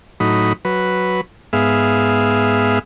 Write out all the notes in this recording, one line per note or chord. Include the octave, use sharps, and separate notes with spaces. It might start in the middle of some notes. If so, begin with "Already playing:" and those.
A2 F#3 D#4 B5
F#3 B4
G#2 B3 G#4 E5 F5